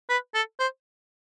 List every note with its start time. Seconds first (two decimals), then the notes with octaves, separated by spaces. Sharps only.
0.09 B4
0.34 A4
0.60 C5